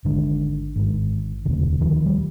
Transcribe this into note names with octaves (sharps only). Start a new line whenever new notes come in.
G#1 G#2 D3
G#1 G#2
E1 D2 C3 D#3
D#3 F3
G3